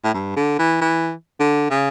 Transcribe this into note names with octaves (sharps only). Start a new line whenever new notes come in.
A2
G2
D3
E3
E3
D3
C#3